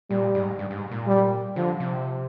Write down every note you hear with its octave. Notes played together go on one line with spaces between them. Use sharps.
A#2 G3
G#2
G2
G2
G#2
A#2
G3
D3 F3
C3